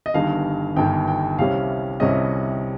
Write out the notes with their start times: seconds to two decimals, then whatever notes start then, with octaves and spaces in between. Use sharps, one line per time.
0.06 D#5
0.14 G1 G2 D#3 F5
0.76 G1 G2 D#3 G5
1.08 G5
1.39 C2 C3 G3 C#4 F5
2.00 C2 C3 G3 C#4 D#5